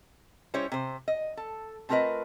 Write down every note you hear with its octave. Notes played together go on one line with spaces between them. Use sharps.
G3 C#4 E4 C5 C#5
C3 C5
D#5
A4
A3 C4 F4 A#4 B4 D#5